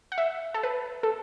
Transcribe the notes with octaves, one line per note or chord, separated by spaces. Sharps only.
F#5
E5
A4
B4
A4